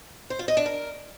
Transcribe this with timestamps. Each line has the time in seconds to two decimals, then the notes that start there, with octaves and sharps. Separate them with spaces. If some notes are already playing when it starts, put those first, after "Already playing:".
0.30 C5
0.39 F4
0.48 D#5
0.57 D4
0.66 A#4